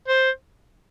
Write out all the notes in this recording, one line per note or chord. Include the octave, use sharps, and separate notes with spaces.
C5